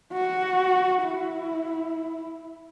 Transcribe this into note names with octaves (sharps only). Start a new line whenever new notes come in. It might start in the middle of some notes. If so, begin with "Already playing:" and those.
F#4
E4